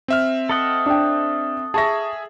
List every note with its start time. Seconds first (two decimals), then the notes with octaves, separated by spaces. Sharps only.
0.08 C4 E5 F6
0.49 A4 D#5 F#5
0.86 D4 G5
1.74 G#4 E5 A5 C#6 A#6